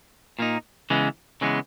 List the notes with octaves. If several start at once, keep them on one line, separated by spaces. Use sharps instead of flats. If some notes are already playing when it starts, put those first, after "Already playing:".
A#2 A#3 D#4
C#3 E3 G#3 B3
C#3 E3 G#3 B3